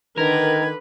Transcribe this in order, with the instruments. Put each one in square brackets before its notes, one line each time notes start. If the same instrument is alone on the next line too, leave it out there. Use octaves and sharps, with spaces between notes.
[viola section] D3 B4 [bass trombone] D#3 [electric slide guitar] A#4 [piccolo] G#6